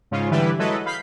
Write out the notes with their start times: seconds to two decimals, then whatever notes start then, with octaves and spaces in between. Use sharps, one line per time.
0.11 G#2 C#3 C#4 F4
0.31 D3 E3 G3 E4 G4 B4
0.58 F#3 G#3 E4 A4 B4 D#5
0.86 F5 B5 G6 B6 C7